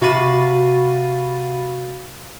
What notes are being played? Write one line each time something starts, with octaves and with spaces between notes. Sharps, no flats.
C3 F#4 F5 B5 A6 D#7